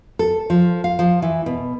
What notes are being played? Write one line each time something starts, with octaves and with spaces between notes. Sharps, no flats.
A4
F3
F5
F3
E3
B2